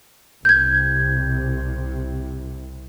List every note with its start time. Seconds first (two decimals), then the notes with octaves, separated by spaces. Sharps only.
0.45 C2 C3 G6 G#6